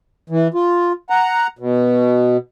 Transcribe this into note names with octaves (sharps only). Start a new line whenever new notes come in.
E3
F4
F#5 A#5
B2